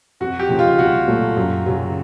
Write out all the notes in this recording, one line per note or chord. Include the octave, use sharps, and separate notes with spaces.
F2 F#4
G4
C#3 F3 A#3 D#4
F4
C2 F#4
A#2 F#3 A3
F#2
C#3 F#3